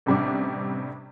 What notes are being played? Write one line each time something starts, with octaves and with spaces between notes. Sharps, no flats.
A1 C3 G3 D4 D6